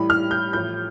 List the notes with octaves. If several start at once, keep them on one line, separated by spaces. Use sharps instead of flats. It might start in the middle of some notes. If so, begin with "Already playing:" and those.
Already playing: A1 A2 G3 B5
F6
G6
A1 A2 F3 G6